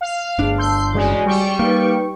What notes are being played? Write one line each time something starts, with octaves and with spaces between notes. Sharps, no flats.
F5
G1 A3 D4 G#4
A5 C6 E6 G6
A1 C#3 G#3 F#4 D5 G#5
G3 G5 C#6
A#3 D#4 B4